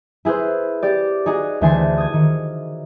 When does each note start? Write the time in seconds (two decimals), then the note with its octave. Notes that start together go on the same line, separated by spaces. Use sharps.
0.25 E4 G#4 B4 C5
0.83 G4 D5
1.26 D#4 F#4 G#4
1.61 D2 E3 D4 C5 G#5 C7
1.98 D#6 G#6
2.13 D#3